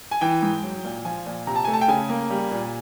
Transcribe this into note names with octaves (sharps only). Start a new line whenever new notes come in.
G#5
E3 G5
G#2
F#3
A#2
F3 G#5
A#2
C3 A#5
A5
A3 G#5
A5
G5
C#3 G#5
A#3
G3
A#2